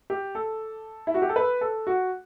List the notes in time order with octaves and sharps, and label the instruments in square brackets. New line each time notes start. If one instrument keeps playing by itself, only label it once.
[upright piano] G4
A4
E4
F#4
G4
A4
B4
A4
F#4